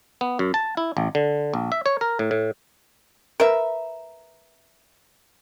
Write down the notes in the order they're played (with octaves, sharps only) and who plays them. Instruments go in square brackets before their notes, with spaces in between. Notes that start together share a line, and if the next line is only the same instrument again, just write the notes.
[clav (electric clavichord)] B3
F#2
A5
E4
A1
D3
A#1
E5
C#5
A#4
A2
A2
[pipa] A#4 B4 E5